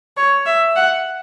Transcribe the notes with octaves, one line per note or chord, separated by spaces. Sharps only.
C#5
E5
F#5